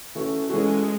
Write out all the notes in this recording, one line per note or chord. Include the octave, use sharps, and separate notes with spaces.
E3 A3 C#4 F#4
E3 G#3 A3 C#4 F#4